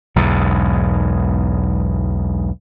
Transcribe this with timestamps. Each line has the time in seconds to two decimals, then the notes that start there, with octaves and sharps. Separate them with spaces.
0.16 B1 E2 G#2